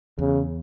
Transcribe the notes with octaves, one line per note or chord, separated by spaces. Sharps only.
E2 C#3